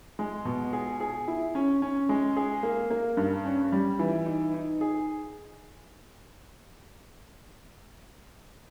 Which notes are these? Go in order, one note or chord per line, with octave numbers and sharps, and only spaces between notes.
G#3
B2
G#4
G#4
E4
C#4
C#4
G#3
G#4
A#3
A#3
G2
C#4
G3
E3
D#4
D#4
G#4